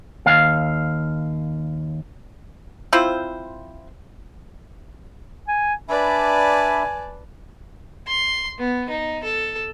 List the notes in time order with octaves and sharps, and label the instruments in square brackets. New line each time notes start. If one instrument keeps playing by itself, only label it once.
[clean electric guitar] D#2 F5
[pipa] C4 E4 F4 C5
[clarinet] G#5
[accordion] D4 E5 B5 [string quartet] B4 D5 A5 [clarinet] G#5
[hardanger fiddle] C6
B3
D#4
A4